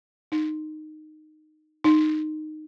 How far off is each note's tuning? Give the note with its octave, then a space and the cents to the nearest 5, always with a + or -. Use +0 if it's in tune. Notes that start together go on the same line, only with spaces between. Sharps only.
D#4 -15
D#4 -15